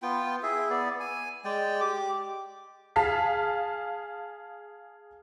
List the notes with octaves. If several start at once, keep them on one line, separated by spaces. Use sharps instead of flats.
B3 F4 G5
E4 G#4 E5
B3 D5
G#5
G#3 D5 G5
G4 D6
G#4 F5 A5 F6 B6